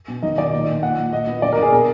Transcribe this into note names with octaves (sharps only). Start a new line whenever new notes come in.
B2
D#3 D#5
D#3 D5
A#2
A#2
A#2 F#5
A#2
A#2 D#5
B3
D3 D5
A#4
D3
G#4
B2 A#4